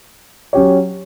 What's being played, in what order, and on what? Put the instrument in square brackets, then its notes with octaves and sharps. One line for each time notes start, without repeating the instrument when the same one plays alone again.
[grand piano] F#3 C#4 G4 C#5